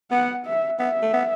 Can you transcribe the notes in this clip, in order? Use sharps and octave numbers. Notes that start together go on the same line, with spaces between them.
B3 F#5
E5
B3 E5
A3
B3